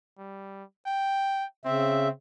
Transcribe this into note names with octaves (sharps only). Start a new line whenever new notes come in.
G3
G5
C#3 C4 E5